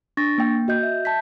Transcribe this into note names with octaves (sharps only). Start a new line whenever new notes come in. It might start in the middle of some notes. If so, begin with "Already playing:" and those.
D4 C#6 A6 A#6
A#3 G5
F#4 D#5 G6
E5
A5 G6 B6